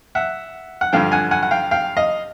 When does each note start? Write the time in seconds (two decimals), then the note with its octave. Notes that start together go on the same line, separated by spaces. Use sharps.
0.15 E5 F#5
0.81 F#5
0.93 G2 D3 F3 F5 G5
1.12 F#5 G#5
1.31 F#5 G#5
1.43 F#5
1.51 F5 G5
1.71 F5 G5
1.96 D#5 F5